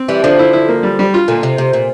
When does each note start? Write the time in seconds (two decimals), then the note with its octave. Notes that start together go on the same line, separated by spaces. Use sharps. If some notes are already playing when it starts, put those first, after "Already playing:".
Already playing: C4
0.08 E3 G3
0.24 D3 F3 D4
0.39 E4
0.53 E4
0.69 A#3
0.83 G3
0.99 G3
1.14 F4
1.28 A#2 D3
1.43 C3
1.58 C3
1.73 A#2